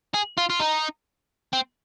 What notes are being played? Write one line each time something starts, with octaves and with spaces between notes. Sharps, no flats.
G#4
F4
F4
D#4
C4